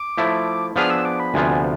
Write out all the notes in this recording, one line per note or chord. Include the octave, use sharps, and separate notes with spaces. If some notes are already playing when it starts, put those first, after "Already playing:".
Already playing: D6
F3 A3 E4
F3 B3 D4 G#4 B4 F6
E6
D6
B5
D2 C3 F3 B3 F4 G#5